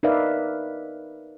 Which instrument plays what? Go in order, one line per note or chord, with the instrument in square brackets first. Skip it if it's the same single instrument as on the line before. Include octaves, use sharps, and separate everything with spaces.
[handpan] D#4 A#4 B4 D5 E5 F5